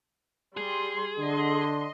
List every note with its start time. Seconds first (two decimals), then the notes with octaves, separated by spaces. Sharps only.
0.57 G3 G#4 C6
1.19 D3 D#5 C6